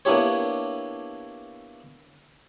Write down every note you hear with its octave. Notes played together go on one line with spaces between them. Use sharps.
A#3 B3 D4 E4 G4 C#5